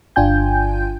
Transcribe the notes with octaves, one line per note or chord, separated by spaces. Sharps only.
G1 D4 F4 G5 G#5 G6